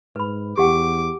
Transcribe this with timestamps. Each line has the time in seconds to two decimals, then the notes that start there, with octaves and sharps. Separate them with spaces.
0.16 G#2 B4 B5
0.57 E2 G4 F#5 G5 D6